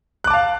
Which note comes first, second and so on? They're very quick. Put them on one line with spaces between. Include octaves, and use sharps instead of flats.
F#6 D6 A5 F5